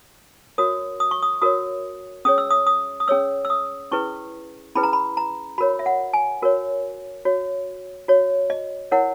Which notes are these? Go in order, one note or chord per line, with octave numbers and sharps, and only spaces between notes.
F#4 A#4 C#5 D#6
D#6
C#6
D#6
F#4 A#4 C#5 D#6
C#4 G#4 C#5 D#6
E6
D#6
D#6
D#6
C#4 G#4 C#5 E6
E6
D#6
C#4 E4 G#4 B4 C#6
C#4 E4 G#4 B4 B5
A#5
B5
A#5
F#4 A#4 C#5 B5
E5
F#5
G#5
F#4 A#4 C#5
F#4 C#5
F#4 C#5
D#5
E4 A#4 C#5 F#5